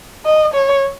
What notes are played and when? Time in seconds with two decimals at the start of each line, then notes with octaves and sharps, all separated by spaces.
0.26 D#5
0.54 C#5